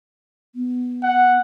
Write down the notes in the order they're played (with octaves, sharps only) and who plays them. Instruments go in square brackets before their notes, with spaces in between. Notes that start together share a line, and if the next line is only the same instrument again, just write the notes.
[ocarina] B3
[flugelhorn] F#5